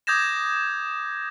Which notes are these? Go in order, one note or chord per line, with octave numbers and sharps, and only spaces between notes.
D6 D#6 G6 G#6 A#6 E7